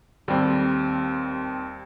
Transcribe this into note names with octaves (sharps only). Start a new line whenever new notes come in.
D#2 G3 C4 A4